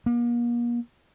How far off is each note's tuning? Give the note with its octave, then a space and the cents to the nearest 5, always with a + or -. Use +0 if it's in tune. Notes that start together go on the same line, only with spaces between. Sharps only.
A#3 +40